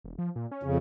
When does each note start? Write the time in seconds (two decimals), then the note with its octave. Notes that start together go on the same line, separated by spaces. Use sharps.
0.04 E1
0.18 F3
0.36 A#2
0.51 C#4
0.63 F2 C#3